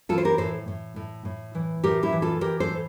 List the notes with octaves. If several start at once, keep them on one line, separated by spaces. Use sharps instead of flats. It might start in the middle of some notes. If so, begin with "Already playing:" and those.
E3 F4 A4
C5
G4 A#4
A2 A4 C5
A2
A2
A2
E3
A2 G4 A#4
E4 G4
E3
F4 A4
E3 G4 A#4
A4 C5
A2